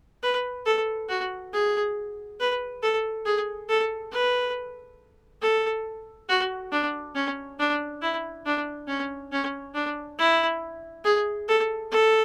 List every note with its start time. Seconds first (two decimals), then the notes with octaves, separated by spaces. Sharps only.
0.23 B4
0.66 A4
1.09 F#4
1.53 G#4
2.40 B4
2.82 A4
3.26 G#4
3.69 A4
4.12 B4
5.42 A4
6.29 F#4
6.72 D4
7.15 C#4
7.59 D4
8.02 E4
8.45 D4
8.88 C#4
9.32 C#4
9.74 D4
10.19 E4
11.05 G#4
11.48 A4
11.91 A4